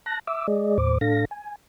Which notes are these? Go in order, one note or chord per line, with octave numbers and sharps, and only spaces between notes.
A5 F#6 A#6
E5 D6 E6
G#3 G#4 D5 D#5
D#2 A2 C5 D6
A2 D4 A4 F5 A#6
G#5